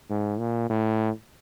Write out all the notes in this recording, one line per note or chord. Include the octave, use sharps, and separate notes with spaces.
G#2
A#2
A2